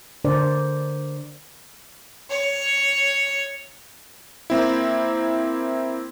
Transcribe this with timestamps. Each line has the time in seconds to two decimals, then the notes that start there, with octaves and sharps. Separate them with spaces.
0.25 D3 D4 A#4 C5 D5
2.30 C#5
4.50 A#3 C4 E4